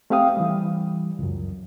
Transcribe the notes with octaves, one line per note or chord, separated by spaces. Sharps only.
A3 C4 G4 F5 G5 D#6
E3 G3
C#2 F#2